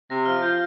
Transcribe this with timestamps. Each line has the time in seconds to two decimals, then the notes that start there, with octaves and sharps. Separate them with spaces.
0.09 C3 A#6
0.25 F3 F6
0.42 F4 G6